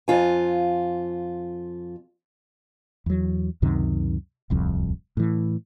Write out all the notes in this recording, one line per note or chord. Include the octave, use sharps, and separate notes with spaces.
F2 F4 G#5
E2 F#3
C#2 F#2 C3 D#3
D1 C2 F2
A2 E3